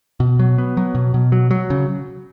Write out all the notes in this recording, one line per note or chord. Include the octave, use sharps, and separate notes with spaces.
B2
F#3
B3
F#3
B2
B2
F#3
F#3
C#3